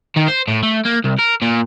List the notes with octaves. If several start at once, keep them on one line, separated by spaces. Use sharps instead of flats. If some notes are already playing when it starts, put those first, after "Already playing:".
D#3
C5
A2
A3
A#3
C2
A#4
A#2